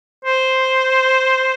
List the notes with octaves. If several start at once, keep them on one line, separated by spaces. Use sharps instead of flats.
C5